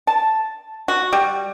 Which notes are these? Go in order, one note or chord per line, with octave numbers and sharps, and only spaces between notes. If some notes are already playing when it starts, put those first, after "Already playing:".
A5
F#4
G3